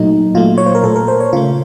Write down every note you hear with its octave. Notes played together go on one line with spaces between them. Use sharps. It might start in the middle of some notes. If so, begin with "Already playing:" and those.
Already playing: A#2 F#3 A3 D#4
A#2 F#3 A3 F4
C#5
C5
A#4
A#2 A3 A4
A#4
C5
C#5
C#3 A3 F4